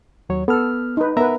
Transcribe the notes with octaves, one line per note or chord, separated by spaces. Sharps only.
D#2 F#3 C#5
B3 A4 F6
D#4 B4
B3 A#4 B4 E5 A#5